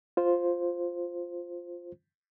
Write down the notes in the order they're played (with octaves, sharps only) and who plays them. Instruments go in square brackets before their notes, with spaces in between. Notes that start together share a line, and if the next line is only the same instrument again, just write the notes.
[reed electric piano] F4 C5